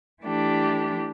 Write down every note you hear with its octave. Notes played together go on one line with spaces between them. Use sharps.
E3 A3 D4 G4